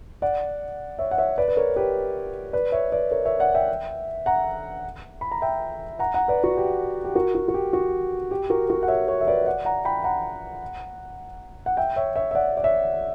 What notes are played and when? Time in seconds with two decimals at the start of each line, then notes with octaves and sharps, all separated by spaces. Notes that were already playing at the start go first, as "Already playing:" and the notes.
0.22 D5 F#5
0.99 C#5 E5
1.11 F#5
1.18 C#5 E5
1.38 B4 D5
1.48 B4
1.57 A#4 C#5
1.76 G4 B4
2.53 B4 D5
2.72 C#5 E5
2.92 B4 D5
3.11 A#4 C#5
3.25 C#5 E5
3.40 D5 F#5
3.54 E5 G5
4.26 F#5 A#5
5.21 B5
5.32 A#5
5.42 E5 G5
5.99 F#5 A#5
6.14 F#5 A#5
6.28 B4 D5
6.44 F#4
6.57 G4
7.05 G4
7.15 F#4 A#4
7.35 F#4
7.48 F#4
7.54 G4
7.73 F#4
8.31 G4
8.50 F#4 A#4
8.69 F#4 A#4
8.83 F#5
8.88 C#5 E5
9.08 A#4 C#5
9.21 E5
9.28 B4 D5
9.46 D5 F#5
9.65 F#5 A#5
9.85 G5 B5
10.04 F#5 A#5
11.66 F#5
11.77 E5 G5
11.96 C#5 E5
12.16 C#5 E5
12.31 E5
12.35 D5 F#5
12.57 D5
12.64 C#5 E5